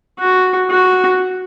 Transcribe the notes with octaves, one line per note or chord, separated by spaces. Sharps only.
F#4
F#4